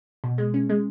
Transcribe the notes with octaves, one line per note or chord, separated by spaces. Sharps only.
B2
G#3
C#4
G#3